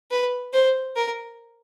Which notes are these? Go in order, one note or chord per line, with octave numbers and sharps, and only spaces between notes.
B4
C5
A#4